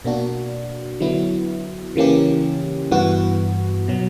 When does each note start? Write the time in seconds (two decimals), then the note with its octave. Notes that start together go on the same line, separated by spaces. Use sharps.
0.05 B2 A#3 D4 F#4
1.00 D3 F#3 B3 E4
1.96 C#3 E3 A#3 C#4 G4
2.91 G2 E3 B3 F#4
3.88 B2 F#3